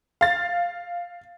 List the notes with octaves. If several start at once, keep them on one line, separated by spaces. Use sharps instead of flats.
F5 A6